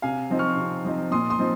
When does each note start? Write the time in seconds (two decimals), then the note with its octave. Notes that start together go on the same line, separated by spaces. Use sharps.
0.02 C3 F5 G#5
0.30 F3 C4 D#4
0.39 C#6 F6
0.57 C3
0.85 F3 C4 D#4
1.11 A#2 C6 D#6
1.30 C6 D#6
1.39 F3 C4 D#4